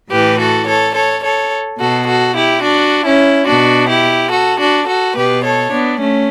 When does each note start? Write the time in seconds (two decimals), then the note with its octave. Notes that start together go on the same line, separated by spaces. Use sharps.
0.10 A2 E3 G4 B4
0.39 F#4 A4
0.67 A4 C#5
0.94 A4 C#5
1.23 A4 C#5
1.79 B2 F#4 A4
2.06 F#4 A4
2.35 E4 G4
2.63 D4 F#4
3.05 C#4 E4
3.47 B2 D4 F#4
3.89 E4 G4
4.31 F#4 A4
4.59 D4 F#4
4.87 F#4 A4
5.15 B2 G4 B4
5.43 A4 C#5
5.71 B3 D4
6.00 A3 C#4